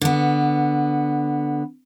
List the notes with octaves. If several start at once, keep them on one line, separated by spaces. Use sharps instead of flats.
D3 B3